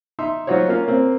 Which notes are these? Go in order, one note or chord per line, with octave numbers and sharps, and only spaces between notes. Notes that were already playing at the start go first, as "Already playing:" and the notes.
D#4 E5 C6
F#3 D#4 F4 F#4 C5 C#5
A#3 C#4 F4 F5
A#3 C4